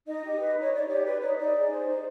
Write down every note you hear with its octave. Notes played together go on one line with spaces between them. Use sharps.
D#4 D#5
G4
B4
D#4
C#5
D#4 D5
G4 C#5
B4 D5
D#4 C#5
D#4 D5
G#4
C5
D#4